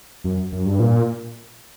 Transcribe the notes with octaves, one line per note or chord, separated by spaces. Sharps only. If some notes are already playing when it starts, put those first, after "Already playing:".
F#2
F#2
G2
A#2